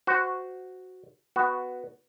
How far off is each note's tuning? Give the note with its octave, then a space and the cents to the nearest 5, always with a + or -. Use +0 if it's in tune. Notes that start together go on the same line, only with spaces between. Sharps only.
F#4 +0 C5 -20
B3 +5 F#4 +0